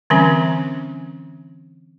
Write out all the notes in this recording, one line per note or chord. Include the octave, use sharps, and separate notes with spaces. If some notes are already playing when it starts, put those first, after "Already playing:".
D3 E3 G3 C4 C#4